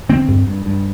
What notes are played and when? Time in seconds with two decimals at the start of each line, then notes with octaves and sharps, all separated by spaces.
0.09 D3 C4
0.28 G2
0.47 G2
0.66 G2